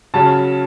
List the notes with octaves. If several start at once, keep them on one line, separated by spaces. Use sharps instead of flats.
C#3 F#3 C#4 A5